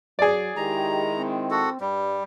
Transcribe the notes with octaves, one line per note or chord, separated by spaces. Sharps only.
F#3 G#4 D5
D#3 G#3 E4 G4 A#5
C4
F#4 A4
G2 G3